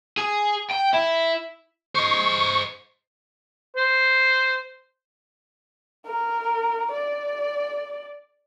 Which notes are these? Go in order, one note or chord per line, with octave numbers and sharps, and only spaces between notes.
G#4
G5
E4
C5 D#5 C#6
C5
A#4
D5